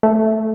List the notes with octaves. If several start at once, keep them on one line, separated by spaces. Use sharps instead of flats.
A3